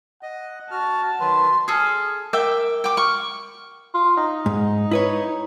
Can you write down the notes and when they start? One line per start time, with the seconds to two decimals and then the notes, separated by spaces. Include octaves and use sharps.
0.23 D#5 F#5
0.71 F#4 A5 F6
1.20 D#3 F#3 B4 C6
1.68 G#4 A4 D#6 F6
2.33 A#4 E5 G5 D6
2.84 G5 D6
2.97 C#6 F6
3.94 F4
4.17 D#4
4.46 G#2
4.91 E4 B4 C#5